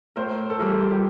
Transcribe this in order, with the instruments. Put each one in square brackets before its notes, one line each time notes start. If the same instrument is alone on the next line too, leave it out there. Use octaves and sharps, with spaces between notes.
[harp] A2 [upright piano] A#4 C5
[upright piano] A4
[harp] E3 G3 [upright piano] G#4 A#4
[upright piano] G4